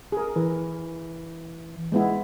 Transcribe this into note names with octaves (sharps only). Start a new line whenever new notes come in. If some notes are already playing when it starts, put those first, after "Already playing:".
G#4 A#4
E3
G#3 B3 E4